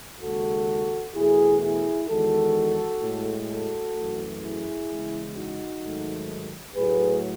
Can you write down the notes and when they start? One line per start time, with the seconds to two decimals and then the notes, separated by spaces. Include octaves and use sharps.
0.21 D#2 C#3 G#3 F#4 A4
1.15 E2 B2 A3 E4 G#4
1.61 E4 G#4
2.08 E2 D#3 G#3 F#4 A4
3.02 A2 G#3
3.48 F#4 A4
3.94 F#2 E3 A3
4.42 E4 G#4
4.88 E2 C#3 G#3
5.34 D#4 F#4
5.81 G#2 D#3 F#3 A3
6.75 A2 F#3 A3 G#4 B4